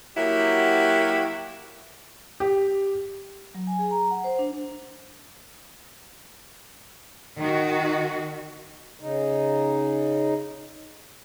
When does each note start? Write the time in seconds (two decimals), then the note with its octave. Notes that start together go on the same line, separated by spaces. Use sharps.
0.17 F#3 A#3 E4 F#4 G4
2.40 G4
3.54 F#3
3.67 G#5
3.79 G#4
3.91 A#5
4.11 F#5
4.24 C5
4.39 D4
7.37 D#3 F#4
9.00 C#3 D#4